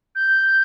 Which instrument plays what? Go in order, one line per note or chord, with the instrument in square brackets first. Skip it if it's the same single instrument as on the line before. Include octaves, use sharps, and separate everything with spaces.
[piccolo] G6